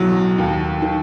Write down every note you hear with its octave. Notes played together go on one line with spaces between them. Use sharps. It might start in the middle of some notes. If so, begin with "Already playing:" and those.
Already playing: B1 A2 F#3
D#2
D#3